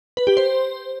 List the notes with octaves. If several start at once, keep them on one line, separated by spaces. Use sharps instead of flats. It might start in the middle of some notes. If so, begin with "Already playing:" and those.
B4
G4
C5